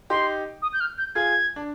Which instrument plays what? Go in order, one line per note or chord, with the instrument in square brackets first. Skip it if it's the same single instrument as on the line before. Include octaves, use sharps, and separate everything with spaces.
[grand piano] D#4 G4 [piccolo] C6
[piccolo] D#6
G6
F6
G6
[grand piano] F4 G#4 [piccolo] G#6
[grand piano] D4